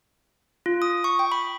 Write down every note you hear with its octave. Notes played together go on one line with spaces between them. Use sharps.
F4
D#6
C#6
G5
B5